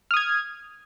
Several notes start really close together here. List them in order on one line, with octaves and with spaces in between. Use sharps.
F6 D#6 G#6